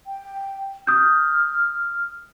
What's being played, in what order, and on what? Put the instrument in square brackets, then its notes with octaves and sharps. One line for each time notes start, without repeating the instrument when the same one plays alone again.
[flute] G5
[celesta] D#6 G6 [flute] F6